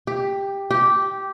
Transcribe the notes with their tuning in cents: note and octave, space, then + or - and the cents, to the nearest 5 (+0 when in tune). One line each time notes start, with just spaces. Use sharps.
G4 +10
G4 -10